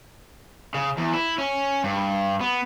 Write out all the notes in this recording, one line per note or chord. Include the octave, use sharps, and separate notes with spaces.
C#3
E2
E4
C#4
G2
B3